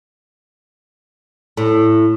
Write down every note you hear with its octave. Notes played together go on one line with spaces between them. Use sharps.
A2